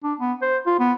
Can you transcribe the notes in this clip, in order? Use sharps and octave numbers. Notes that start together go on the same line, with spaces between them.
D4
B3
C5
F4
B3